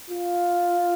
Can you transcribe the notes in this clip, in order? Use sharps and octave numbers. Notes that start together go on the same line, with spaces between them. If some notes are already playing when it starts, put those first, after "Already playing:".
F4